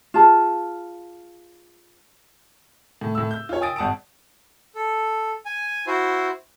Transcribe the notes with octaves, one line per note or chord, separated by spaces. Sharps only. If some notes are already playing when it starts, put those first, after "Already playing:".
F4 G#4 A5
A2
A2 E6
G6
F4 C#5
G5 G#5 D#6 A6 D7
G#1 F#5 A5 D#6 D7
A4
G#5
E4 F#4 C5